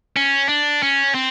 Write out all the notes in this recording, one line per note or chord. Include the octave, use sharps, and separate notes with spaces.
C#4
D4
C#4
C4